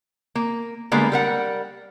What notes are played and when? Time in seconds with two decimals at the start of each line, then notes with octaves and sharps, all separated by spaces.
0.35 A#3
0.92 D3 G3 G#3 A#3 B3
1.12 G3 A#4 F#5